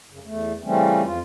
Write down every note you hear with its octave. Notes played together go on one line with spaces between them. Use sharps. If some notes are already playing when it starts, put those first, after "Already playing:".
F#2 C#3
E2 A3
C#3 E3 G3 A3 C4 C#4
F2 F4